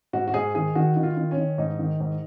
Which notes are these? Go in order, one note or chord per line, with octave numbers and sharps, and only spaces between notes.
G#2 F#4
F#4
G#2 G#4
D#3 G#4
D#3 F#4
D#3
F4
D#3
C#4
D#3
G#2 D#4
D#3
G#2